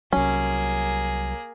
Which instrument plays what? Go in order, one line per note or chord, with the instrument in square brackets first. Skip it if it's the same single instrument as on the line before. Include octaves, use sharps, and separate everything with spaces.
[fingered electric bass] C2 F#3 [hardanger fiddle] A#3 G#4 [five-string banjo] C#4